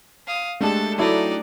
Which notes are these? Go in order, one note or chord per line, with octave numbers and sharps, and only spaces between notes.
F5 D#6
G#3 A3 D4 G4 A4 A5
F#3 D#4 E4 A4 D5